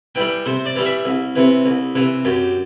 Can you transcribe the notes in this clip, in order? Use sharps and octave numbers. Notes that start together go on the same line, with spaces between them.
E3 G3 G5
C3 C5
D5
E3 G3
E5
C2
C3 E3
C2
C3 E3
F#2 G4